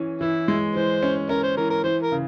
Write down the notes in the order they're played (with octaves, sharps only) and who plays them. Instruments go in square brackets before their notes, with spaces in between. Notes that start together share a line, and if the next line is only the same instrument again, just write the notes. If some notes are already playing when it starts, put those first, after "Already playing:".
Already playing: [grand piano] E3 C#4
[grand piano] E3 [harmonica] E4
[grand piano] G#3
[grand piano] E3 [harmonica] C5
[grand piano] C#4
[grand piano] C#4 [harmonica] A#4
[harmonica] C5
[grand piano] E3 [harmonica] A#4
[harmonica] A#4
[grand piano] E3 [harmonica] C5
[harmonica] A#4
[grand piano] C#3